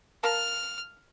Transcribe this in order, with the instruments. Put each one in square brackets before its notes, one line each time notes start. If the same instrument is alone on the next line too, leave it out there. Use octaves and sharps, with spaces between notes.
[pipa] A#4 F5 A5 [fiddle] F6